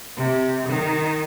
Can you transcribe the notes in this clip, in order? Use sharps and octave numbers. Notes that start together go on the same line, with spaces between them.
C3
D#3